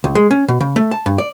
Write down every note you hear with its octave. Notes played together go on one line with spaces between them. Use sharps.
C#2
G#3
C#4
B2
C#3
A3
A5
G2
D5